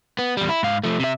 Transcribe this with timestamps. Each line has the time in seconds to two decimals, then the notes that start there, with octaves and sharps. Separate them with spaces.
0.19 B3
0.37 E2 G3
0.49 E4
0.63 G#2 F5
0.84 F3 A3
1.00 C3 E5